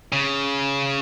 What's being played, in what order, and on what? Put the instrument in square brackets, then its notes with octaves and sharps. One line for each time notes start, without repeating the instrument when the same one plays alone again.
[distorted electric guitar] C#3